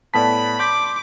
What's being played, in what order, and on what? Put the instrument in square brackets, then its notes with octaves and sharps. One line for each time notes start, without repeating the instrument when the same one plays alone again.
[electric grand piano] A2 B3 B6 [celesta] D5 A5 [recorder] B5
[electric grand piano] C6 G6 B6 [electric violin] D6